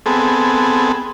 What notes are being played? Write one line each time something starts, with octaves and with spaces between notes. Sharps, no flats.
B3 C4 G#4 A4